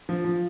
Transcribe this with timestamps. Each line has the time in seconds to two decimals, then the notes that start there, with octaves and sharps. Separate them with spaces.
0.09 F3
0.25 F3